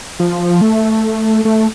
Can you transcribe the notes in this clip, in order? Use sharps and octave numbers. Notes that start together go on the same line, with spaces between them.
F3
A3
A3